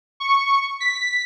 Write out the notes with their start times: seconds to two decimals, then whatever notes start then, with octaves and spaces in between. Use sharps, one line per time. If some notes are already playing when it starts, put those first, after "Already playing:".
0.20 C#6
0.80 B6